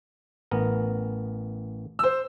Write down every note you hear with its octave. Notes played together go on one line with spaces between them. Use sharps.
A1 B3 A#4
C5 E6